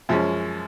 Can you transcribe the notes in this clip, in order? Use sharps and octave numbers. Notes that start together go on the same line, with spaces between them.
F#2 F3 G#3 C#4